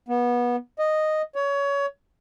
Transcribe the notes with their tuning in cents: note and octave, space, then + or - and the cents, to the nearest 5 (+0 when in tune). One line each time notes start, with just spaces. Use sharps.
B3 -25
D#5 -5
C#5 +20